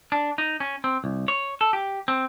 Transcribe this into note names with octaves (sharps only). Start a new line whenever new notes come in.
D4
D#4
C#4
C4
C2
C#5
A4
G4
C4